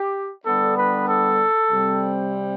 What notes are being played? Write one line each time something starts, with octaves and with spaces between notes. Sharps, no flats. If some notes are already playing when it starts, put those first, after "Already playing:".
Already playing: G4
D3 G3 B3 D4 A4
B4
A4
C3 G3 C4